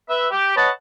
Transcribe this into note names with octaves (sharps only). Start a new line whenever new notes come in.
B4 E5
G4
B4 C#5 D#5 F#5 A5